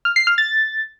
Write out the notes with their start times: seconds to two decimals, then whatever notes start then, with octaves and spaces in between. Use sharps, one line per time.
0.05 F6
0.16 C7
0.27 F6
0.38 A6